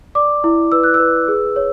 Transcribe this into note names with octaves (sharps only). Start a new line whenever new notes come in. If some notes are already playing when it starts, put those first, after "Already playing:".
D5 D6
E4
B4 E6
F#6
E6
B4
G#4
C#5